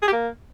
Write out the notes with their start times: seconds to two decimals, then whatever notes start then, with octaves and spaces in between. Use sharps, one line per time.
0.02 G#4
0.07 G4
0.13 A#3